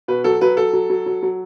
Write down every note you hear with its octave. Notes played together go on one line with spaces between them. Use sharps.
B2 B4
F#3 A4
F#3 B4
F#3 A4
F#3
F#3
F#3
F#3